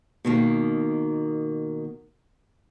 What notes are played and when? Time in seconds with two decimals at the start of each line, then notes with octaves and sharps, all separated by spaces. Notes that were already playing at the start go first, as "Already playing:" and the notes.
0.25 B2 D#3 A#3